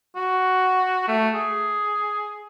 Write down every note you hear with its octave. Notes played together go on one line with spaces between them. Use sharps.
F#4
A3
G#4